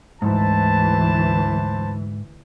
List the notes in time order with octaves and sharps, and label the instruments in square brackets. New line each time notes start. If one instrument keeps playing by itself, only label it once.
[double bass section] D2 E3 [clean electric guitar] G#2 [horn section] B4 C5 A5